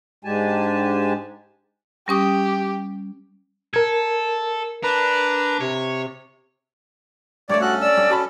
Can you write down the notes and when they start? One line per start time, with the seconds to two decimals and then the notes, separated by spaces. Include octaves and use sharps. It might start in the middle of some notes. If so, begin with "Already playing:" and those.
0.25 G#2 G#3 D4 G4 G#5 A5
2.08 G3 C#4 G4 D#6
3.74 A4 A#4 G#6
4.83 D4 B4 A#5
5.60 C3 C#5
7.49 G2 A3 C#5 D5
7.61 C#4 F#4 A4 F#6
7.81 D5 E6
7.97 G2
8.10 F#4 A5 B5